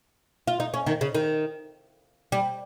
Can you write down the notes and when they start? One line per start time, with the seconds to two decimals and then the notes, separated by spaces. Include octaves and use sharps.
0.47 F4
0.60 D#4
0.74 C#4
0.87 D#3
1.01 C#3
1.15 D#3
2.32 G3